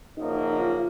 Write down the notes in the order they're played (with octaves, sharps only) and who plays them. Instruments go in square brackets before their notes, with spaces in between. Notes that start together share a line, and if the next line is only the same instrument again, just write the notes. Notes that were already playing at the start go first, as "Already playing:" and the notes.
[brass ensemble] F#1 F#2 F3 A#3 [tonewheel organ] D#4
[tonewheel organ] F4